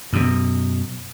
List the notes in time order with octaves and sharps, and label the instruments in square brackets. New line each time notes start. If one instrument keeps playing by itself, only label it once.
[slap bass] F#2 B2